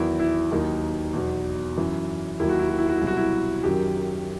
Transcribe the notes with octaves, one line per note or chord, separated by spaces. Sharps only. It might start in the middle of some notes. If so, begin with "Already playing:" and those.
Already playing: E2 D#3 F#3 E4
E4
D#2 D#3 F#3 D#4
E2 B2 F#3
F#2 E3
D#2 D#3 F#3 E4
F#4
E4
F#4
E4
F#4
C2 B2 F#3 E4
F#4
E4
F#2 D#3 F#3 G4